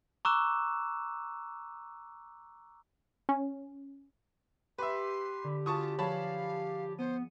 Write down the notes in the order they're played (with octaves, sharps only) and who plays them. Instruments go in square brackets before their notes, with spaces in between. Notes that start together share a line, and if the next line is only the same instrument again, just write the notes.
[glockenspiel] A#5 C#6 D6 E6 F#6 E7
[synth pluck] C#4
[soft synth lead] G4 [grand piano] B4 E5 [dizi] C6
[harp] D3
[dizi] F4 [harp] F#4 G#4 B6 [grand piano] A5 C#6 D#6
[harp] F3 G#4 B4 [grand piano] C#5 A5 B5 [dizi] F5
[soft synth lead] B3 [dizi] C5 [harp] C#7 D#7